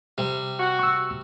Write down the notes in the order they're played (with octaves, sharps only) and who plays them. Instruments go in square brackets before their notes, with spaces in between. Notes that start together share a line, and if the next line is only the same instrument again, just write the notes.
[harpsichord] C3 G3
[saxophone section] F#4
[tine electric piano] C#6 E6